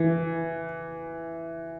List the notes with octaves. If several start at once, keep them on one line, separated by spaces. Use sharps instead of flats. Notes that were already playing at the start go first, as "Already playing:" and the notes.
Already playing: E3